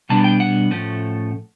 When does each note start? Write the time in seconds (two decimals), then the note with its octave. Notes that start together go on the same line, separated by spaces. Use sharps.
0.09 B2 G3 B3 D4 A5
0.24 G5
0.40 F#5
0.71 A2 F3 A3 C#4